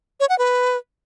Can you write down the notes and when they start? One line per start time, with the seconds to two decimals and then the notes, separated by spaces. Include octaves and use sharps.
0.20 C#5
0.29 F#5
0.39 B4